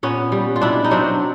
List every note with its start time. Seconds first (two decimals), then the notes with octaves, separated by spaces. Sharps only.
0.03 A#2 B3 C#4
0.32 G3
0.56 F4
0.61 B2 D4 E4
0.84 D#4
0.91 F#3 C4 D4